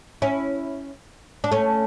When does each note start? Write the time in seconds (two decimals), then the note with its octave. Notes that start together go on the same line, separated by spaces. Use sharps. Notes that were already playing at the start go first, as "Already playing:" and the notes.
0.22 C#4 E4
1.44 D4
1.51 A3 C#4